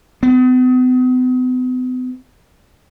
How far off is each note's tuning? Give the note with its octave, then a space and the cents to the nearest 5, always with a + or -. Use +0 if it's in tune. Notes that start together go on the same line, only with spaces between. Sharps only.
B3 +45